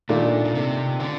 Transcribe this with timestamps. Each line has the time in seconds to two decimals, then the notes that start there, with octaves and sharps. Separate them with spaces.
0.09 A#2 D#3 A3 D4 F4
0.45 A#2
0.55 C3
1.00 D3